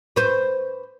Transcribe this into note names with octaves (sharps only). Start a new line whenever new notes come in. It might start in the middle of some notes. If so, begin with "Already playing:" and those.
B4 C5